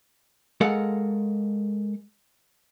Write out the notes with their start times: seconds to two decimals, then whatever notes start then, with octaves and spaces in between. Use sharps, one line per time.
0.61 G#3 A4 A#4 F5 F#5